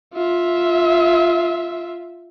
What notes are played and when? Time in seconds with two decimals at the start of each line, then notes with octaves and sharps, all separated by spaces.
0.13 F4 E5